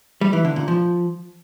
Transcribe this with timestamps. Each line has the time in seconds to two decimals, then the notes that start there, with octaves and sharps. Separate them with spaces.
0.21 G3
0.33 E3
0.45 D3
0.56 A#2
0.68 F3